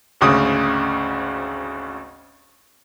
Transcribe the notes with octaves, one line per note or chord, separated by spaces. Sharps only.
G#1 D2 C#3 D#6